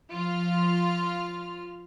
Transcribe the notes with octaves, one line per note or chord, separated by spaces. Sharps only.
F3 F4 F6